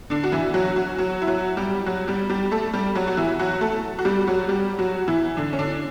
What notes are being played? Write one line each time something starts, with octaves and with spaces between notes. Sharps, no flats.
D3 D4
F#4
E3 E4
F#3 F#4
F#3 F#4
F#3 F#4
E4
F#3 F#4
G3 G4
F#3 F#4
G3 G4
G3 G4
A3 A4
G3 G4
F#3 F#4
F#4
E3 E4
F#3 F#4
A3 A4
F#4
G3 G4
F#3 F#4
G3 G4
F#3 F#4
E3 E4
D3 D4
C#4
D3 D4